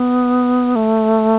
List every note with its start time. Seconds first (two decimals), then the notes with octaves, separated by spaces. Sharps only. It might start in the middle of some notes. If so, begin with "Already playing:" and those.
Already playing: B3
0.76 A3